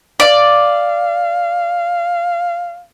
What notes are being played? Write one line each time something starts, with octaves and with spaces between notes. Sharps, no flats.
D5 F5